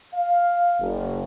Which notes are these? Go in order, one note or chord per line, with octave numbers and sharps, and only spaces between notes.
F5
F#1